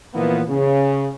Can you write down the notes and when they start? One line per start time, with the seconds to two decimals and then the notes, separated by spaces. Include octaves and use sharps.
0.14 A#2 E3 F3 A#3 B3
0.48 C#3